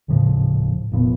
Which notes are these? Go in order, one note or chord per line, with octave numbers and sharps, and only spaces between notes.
D#1 A2 C#3 F3
F1 A#2 F3 B3